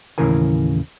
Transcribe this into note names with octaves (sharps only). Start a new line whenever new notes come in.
D#2 A2 C#3 E3 A#4 G#5